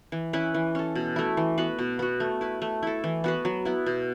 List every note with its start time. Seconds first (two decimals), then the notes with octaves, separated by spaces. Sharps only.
0.12 E3
0.33 C#4 E4 B4
0.54 E3
0.75 C#4 A4
0.95 B2
1.16 A3 E4
1.37 E3
1.58 B3 F#4 B4
1.79 B2
1.99 B3 F#4
2.20 A3
2.41 E4 B4
2.62 A3
2.83 E4 A4
3.04 E3
3.24 B3 F#4 B4
3.45 F#3
3.65 B3 E4
3.86 B2